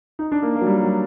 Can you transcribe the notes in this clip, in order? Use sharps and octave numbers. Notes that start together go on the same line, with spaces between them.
D#4
D4
A#3
A#3
F#3
G3
F#3